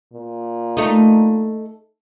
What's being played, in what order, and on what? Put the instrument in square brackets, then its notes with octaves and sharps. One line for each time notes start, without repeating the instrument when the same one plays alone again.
[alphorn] A#2
[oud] A3 D#4